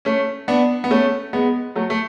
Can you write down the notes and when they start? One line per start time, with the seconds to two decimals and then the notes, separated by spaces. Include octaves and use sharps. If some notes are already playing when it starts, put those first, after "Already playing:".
0.05 A3 C#4
0.48 B3 D4
0.84 B3
0.91 A3 C#4
1.33 G#3 B3
1.75 F#3 A3
1.90 A3